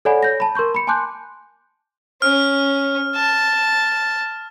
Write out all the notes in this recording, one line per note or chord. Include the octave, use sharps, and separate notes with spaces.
A4 C#5 D5 F#5 G#5 B5
C#5 G6 A#6
A5 B5
A#4 C6 C#6 G6
B5 C#7
G#5 A5 C6 D6 F#6 G6
C#4 F6
A5